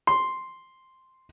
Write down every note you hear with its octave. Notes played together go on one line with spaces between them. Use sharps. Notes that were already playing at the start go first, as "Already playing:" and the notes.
C6